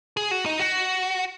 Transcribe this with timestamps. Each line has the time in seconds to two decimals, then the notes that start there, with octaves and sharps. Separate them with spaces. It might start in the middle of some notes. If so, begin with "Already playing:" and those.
0.17 G#4
0.31 F#4
0.46 D#4
0.59 F#4